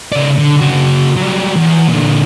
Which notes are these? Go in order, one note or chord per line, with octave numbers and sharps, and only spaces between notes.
C#3 D5
D3
C#3 F#4
F#3 G3
E2
A#2 D3